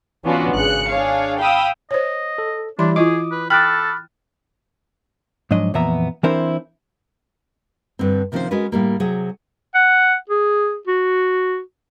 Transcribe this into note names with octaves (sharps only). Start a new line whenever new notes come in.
E3 B3 C#4 D4 F4 F#4
G#1 C#3 F#6 C#7
D4 G#4 C#5 F5
F5 G5 B5 D#6 E6
C5 C#5 D#5
A4
E3 G3 D4 E4 C6
E4 F4 G#4 D#5 D6 D#6
B4
A4 G5 B5 D6 F6 F#6 A6
G#2 F3 F#3 D4 D#5
F2 A#2 E3 B3 E5 A#5
E3 C4 D4 E4 A#4 C5
G2 D3 C4
C3 D#3 F3 C4 C#4 C5
G#3 C#4 F#4 A#4 B4
A2 G3 A#3
C3 F#3 G#4
F#5
G#4
F#4